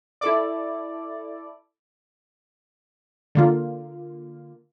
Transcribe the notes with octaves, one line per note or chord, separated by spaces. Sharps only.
E4 A4 D5
D3 A#3 F4